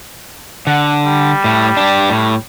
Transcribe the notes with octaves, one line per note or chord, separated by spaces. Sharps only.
D3 F#5
G3
A2
D4 G4
A2